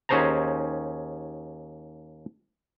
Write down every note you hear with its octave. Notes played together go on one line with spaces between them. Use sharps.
D#2 C#4 G#4 C5 A5 A#5